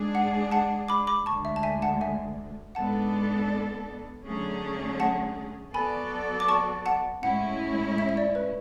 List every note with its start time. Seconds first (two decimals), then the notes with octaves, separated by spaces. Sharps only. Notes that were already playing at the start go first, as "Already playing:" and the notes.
Already playing: G#2 G#3 D4 G#4
0.15 F#5
0.52 F#5 A5
0.88 B5 D6
1.07 B5 D6
1.26 D2 D3 G#3 A5 C#6
1.45 E5
1.56 A5
1.63 E5 G#5
1.82 F#5 A5
2.01 E5 G#5
2.75 G#2 G#3 B3 D4 A4 F#5 A5
4.25 D3 F#3 A3 C#4 G#4
5.00 F#5 A5
5.74 F#3 B3 F#4 A4 D5 G#5 B5
6.40 D6
6.48 A5 C#6
6.86 F#5 A5
7.23 A2 G#3 C#4 E4 F#5
7.98 E5
8.09 E5
8.17 D5
8.35 B4